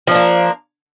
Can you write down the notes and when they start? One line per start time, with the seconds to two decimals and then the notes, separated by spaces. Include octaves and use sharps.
0.07 F3
0.11 D4
0.15 A#3